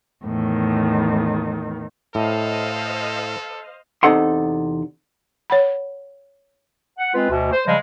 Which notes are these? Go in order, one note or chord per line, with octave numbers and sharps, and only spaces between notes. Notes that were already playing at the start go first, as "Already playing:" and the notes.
E2 A2 D#3
A2 A4 C5 D#5 F5
E2 C3 D#4 A4 F#5 C6
C#5 F#5 B5
F#5
G#3 C4 F4 B4
D2 B2
C5
C#3 F3 G3 G#3